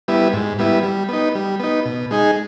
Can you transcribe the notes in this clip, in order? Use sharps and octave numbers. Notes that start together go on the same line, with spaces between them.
G3 B3 E4
G#2
G3 B3 E4
G3
B3 D#4
G3
B3 D#4
B2
G#3 D#4 G#4